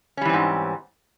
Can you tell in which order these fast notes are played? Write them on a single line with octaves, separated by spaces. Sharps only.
C#4 G3 E3 C4 G#2